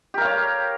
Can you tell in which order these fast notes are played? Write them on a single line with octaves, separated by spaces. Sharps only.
G4 A#4 F5 C#5